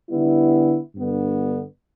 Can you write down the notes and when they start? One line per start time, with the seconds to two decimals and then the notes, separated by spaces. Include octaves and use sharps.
0.10 D3 G3 B3 E4
0.95 G2 D3 B3